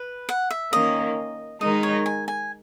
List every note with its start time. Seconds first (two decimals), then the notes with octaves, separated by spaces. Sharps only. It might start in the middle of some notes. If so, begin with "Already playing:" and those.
Already playing: B4
0.29 F#5
0.51 E5
0.73 D#3 A#3 C#4 D#5
1.61 D#3 G#3 D#4 A#4 D#5
1.83 C#5
2.06 G#5
2.28 G#5